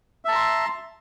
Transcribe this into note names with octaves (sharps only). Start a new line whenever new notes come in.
E5 A5 A#5 C6